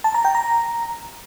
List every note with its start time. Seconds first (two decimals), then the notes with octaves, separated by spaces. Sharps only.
0.04 A5
0.14 A#5
0.25 G5
0.35 A#5